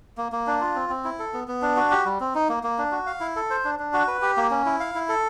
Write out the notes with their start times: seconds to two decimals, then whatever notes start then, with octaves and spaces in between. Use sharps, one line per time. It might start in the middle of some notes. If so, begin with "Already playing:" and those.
0.17 A#3
0.32 A#3
0.47 D4
0.61 F4
0.75 C4
0.90 C4
1.04 E4
1.19 A4
1.34 B3
1.48 B3
1.62 D4
1.77 F#4
1.91 G4
2.05 G3
2.20 C4
2.35 D#4
2.49 A#3
2.63 A#3
2.78 D4
2.92 F#4
3.07 F5
3.20 E4
3.36 A4
3.50 C5
3.65 D4
3.79 D4
3.93 F#4
4.08 B4
4.22 G4
4.37 A#3
4.51 C#4
4.66 E4
4.80 F5
4.95 E4
5.09 A4